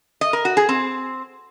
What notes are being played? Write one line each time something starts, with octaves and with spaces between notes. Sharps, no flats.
D#5
A#4
F#4
G#4
C4